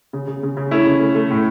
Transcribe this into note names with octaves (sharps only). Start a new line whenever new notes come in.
C#3
C#3
C#3
C#3
A3 C#4 E4
C#3
A3
A3
A2